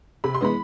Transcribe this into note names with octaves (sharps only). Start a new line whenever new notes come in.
C3 B5
C6
E3 G#3 B3 B5